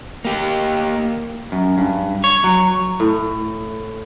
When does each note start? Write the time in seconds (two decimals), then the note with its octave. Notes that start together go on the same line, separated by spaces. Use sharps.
0.25 A#3 G4
1.52 F#2
1.78 G2
2.24 C#5
2.44 F#3
3.00 A2